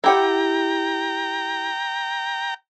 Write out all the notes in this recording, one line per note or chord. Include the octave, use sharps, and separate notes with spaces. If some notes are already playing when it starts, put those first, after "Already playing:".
E4 G4 F#5 G5 A#5